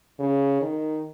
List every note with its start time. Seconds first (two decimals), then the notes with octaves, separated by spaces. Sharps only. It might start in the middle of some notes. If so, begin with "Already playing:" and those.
0.19 C#3
0.62 D#3